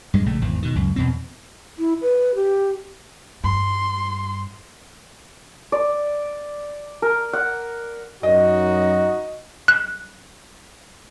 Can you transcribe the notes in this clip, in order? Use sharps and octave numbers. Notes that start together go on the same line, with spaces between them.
G2 G#3
A#1 C#3 A3
G#1 E2
B2 D#3
C#2 F#2
E2 B2 C4
E4
B4
G4
G2 C6
D5
A#4
F#5
F#2 D#4 F#4 D#5
F#6